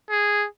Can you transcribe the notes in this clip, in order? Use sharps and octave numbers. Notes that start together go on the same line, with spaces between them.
G#4